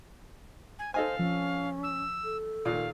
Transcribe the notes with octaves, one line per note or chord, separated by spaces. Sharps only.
G#5
A4 C5 D#5 F5 G#5
F3 C#4
E6
A4
D#2 A#2 F5